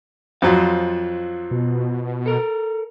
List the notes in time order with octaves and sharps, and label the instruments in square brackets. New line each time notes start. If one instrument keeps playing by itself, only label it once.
[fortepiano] F2 F#3 [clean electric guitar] F4 C5 F5
[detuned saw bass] B2
[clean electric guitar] A4 A#4